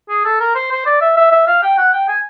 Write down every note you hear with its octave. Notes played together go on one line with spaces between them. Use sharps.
G#4
A4
A#4
C5
C5
D5
E5
E5
E5
F5
G5
F#5
G5
G#5